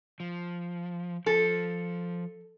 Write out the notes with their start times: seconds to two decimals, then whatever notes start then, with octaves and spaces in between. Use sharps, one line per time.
0.20 F3
1.26 F3 A4